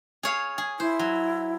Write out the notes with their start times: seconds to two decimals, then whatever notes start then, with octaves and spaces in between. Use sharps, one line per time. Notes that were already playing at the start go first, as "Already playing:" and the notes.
0.23 G#4 C#5 F5
0.58 G#4
0.80 E4 C5
0.99 F#3